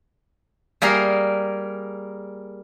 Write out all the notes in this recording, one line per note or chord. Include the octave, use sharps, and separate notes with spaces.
G3 A#3 G#4 A#4